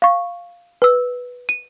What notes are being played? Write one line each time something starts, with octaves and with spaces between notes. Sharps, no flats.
F5 C#6
B4 E6
D#7